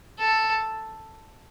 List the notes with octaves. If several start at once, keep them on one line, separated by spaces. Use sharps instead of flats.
A4